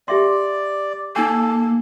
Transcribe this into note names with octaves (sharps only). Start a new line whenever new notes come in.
G4 D5 E5 C6
A#3 D#4 A4 G#5